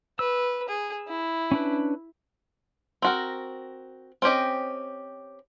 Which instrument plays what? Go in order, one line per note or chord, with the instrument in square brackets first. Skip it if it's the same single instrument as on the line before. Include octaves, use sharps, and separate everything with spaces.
[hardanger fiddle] B4 [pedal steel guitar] E6
[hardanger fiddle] G#4
E4
[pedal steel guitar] C#4 D4 B4
[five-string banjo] C4 F#4 A#4
C4 C#4 G4 D#5